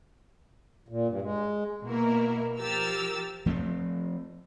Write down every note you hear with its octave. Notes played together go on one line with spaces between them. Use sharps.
A#2
G2
G#3
B2 A#3 E4 A#4
F3 G4 A#4 E6 F6 A6
F3 A3 B3 C4